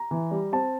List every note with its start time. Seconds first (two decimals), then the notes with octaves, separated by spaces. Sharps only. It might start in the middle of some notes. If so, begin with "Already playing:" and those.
Already playing: A#5
0.11 E3
0.31 G3
0.52 C4 A5